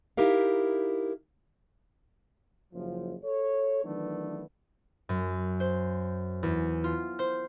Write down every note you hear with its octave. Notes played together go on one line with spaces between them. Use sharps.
D#4 E4 G4 A#4 F5
F#1 F3
A4 C#5
D#3 E3 F#3 A3 B3 D4
F#2
C5
E2
F4
C5